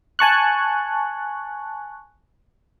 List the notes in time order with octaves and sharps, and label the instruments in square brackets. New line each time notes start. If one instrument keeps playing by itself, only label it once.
[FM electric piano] G#5 A5 C#6 F#6